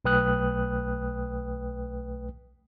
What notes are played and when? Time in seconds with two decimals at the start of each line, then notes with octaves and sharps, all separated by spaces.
0.05 B1 A3 B4 G5 D#6 F#6